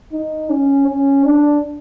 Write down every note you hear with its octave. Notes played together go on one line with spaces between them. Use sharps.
D#4
C#4
C#4
D4